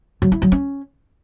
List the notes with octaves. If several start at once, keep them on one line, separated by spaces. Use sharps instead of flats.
F#3
E4
F#3
C#4